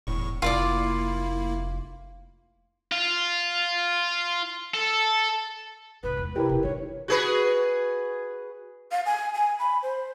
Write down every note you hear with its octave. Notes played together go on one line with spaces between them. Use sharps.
E1 E2 A2 C#6
F1 A#3 E4 F4 D5 D6
F4
A4
F1 G#2 B4
E2 G#3
C3 E4 G4 A#4 B4
E1 B1
D#4 F4 C#5
F#4 G#4 B4
F5
G#5
G#5
B5
C5